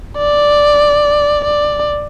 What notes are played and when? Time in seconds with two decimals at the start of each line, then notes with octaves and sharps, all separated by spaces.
0.17 D5
1.45 D5